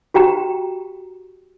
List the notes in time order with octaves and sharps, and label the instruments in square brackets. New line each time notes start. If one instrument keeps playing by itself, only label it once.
[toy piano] F#4 G4 G5 A#5